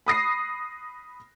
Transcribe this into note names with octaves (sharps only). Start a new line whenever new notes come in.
B5 D#6 A#6 C7